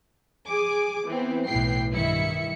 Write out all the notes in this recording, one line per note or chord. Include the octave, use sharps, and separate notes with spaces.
G#4 G#5 D6
E3 B3 C4
B1 A2 E3 G5 C7
G2 D#3 E4 E5 C#7